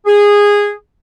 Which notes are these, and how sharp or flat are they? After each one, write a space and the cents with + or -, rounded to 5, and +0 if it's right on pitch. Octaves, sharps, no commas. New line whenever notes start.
G#4 -15